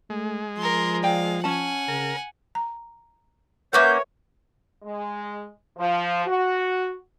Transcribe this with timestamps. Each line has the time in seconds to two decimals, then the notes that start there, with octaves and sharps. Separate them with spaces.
0.10 G#3 A3
0.58 F3 A#4 C6
1.03 D5 F5 G5
1.44 C#4 F#5 G#5 A5
1.88 C#3 A#4
2.55 A#5
3.73 A#3 C#4 A#4 B4 C#5 E5 F#5 G6
4.83 G#3
5.77 F3
6.25 F#4